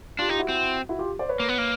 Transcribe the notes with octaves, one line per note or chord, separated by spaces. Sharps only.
D4 F4 G4
D#4 F4 G4
E4 F#4
C4
E4 F#4
F4 G4
C5 D5
B4 C#5
A#3
B3
A#3